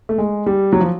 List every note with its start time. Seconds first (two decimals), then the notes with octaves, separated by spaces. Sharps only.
0.09 A3
0.18 G#3
0.46 G3
0.73 F#3
0.80 F3